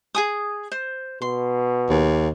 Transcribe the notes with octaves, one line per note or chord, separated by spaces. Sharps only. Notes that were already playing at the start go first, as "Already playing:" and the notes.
G#4 G#5 D#6
C5
B2 C6
D#2